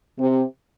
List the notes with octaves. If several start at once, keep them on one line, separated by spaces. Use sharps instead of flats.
C3